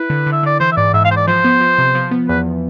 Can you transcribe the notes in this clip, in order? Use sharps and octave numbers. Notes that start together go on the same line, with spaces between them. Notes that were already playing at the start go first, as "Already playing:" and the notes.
Already playing: E4 B4
D3
D3
E5
D3 D5
E3 C5
E5
G#2 D5
G#2 E5
F5
G#2 C5
D5
F3 C5
B3
F3
C3
F3
B3
E2 B4